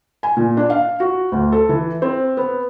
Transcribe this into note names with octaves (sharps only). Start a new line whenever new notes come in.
G#5
A#2
D4
F5
F#4
D2
A4
E3
C4
B3